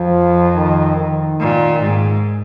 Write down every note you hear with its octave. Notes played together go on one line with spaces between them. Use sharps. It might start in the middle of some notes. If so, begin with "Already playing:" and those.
Already playing: F2 F3
D#3
D#3
A#2
G#2